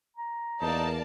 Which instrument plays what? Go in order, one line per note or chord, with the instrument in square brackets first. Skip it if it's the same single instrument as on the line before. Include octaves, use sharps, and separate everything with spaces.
[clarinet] A#5
[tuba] E2 [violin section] A#3 D5 A5 [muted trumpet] D#4